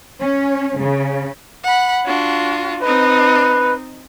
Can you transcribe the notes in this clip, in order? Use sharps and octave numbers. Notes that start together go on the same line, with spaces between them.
C#4
C#3
F#5 B5
D4 F4 F#4
C4 D#4 B4 D#5